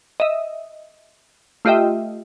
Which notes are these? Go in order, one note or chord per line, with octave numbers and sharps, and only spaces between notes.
D#5 E5
A3 F4 G4 D#5 E5 G5